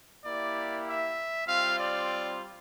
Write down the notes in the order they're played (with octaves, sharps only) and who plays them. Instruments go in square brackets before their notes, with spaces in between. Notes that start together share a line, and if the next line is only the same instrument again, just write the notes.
[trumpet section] A#3 E4 G4 D5
E5
G3 C4 F4 F5
D5